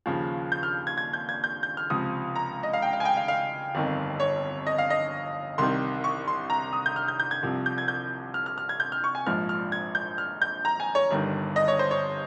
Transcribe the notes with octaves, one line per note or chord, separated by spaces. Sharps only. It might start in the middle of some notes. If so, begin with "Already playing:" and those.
D#2 C#3 F3
G6
F6
G#6
G#6
G6
G#6
G6
G6
F6
C#2 C3 F3 D#6
A#5
D#5
F5
G5
F5
G#5
G5
F5
F5
G1 F2 D#3
C#5
D#5
F5
D#5
C2 C3 D#3 C6
C#6
C6
A#5
D#6
G6
F6
G6
G6
G#6
C2 C3 F3
G6
G#6
G6
F6
F6
F6
G#6
G6
F6
C#6
G#5
A#1 G#2 F3 F6
F6
G#6
G6
F6
G6
A#5
G#5
C#5
G1 G2 D#3
D#5
C#5
C5
C#5